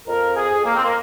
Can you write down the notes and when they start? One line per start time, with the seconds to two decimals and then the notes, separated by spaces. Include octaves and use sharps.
0.07 F2 A#4
0.36 G#4
0.51 F2
0.65 A#3
0.74 C4
0.84 A#3